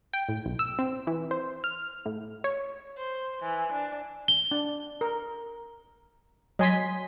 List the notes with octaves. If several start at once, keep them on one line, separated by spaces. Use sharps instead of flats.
G5
A2
B1
E6
C4
E3
C5
F6
A2
C#5
C5
E3 G#5
D4
G7
D4
A#4
F#3 D#5 G#5 C6 B6